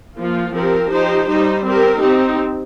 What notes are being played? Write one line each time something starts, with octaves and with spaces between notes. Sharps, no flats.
F3 A#3 F4
F3 C4 G4 A#4
F3 D#4 G4 C5
G3 D#4 C5
C4 G4 A#4
C4 D#4 G4